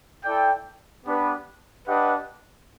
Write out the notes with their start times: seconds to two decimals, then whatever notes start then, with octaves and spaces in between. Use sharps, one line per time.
0.24 E4 A4 D5 G5
1.06 B3 D4 G4 B4
1.87 D4 G4 B4 D#5 F#5